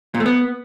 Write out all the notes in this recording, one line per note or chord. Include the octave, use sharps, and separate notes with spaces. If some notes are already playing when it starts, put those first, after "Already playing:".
A#2
A3
B3